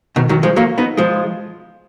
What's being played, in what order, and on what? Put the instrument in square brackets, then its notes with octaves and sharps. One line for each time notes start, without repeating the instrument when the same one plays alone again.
[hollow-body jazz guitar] B2 D#3
D#3 F#3
F3 G#3
F#3 A#3
B3 D#4
F3 G#3